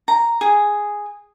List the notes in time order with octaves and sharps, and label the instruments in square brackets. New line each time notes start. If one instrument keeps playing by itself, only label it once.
[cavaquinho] A#5
G#4